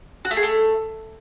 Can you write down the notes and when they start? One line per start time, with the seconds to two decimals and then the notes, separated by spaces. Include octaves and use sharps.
0.25 F#4
0.31 A3
0.37 G#4
0.43 A3